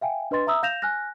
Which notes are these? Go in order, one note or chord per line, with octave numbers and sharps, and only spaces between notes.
E5 F5 G5 G#5
D4 B4 D#5 C6 A6
E5 A#5 D#6 E6
F5 G6 A#6 E7 F7
G#5 F6 F#6 A#6